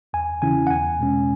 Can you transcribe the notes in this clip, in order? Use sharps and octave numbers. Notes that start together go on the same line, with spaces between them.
E2 G#5
C#3 E3 C#4 E4 G#5
F#5
E2 G#5
B2 G#3 C#4